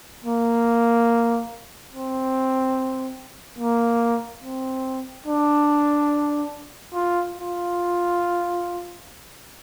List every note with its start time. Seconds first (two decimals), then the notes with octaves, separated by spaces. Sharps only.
0.24 A#3
1.92 C4
3.59 A#3
4.43 C4
5.27 D4
6.93 F4
7.36 F4